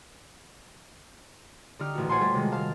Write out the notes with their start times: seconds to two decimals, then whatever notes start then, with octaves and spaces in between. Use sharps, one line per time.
1.79 D3 D#4 G4 F6
1.95 D#1 A1 F#4
2.09 C5 C#5 F#5 G#5 A5 C6
2.21 G3 A3 A4 C#5
2.34 C3 D#3 G#3
2.52 C5 F5 A5